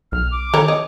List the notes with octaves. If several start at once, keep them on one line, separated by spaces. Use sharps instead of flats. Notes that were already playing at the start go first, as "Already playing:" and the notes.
B1 F6
D6
D#3 A4 C#5 A#5
C#5 D#5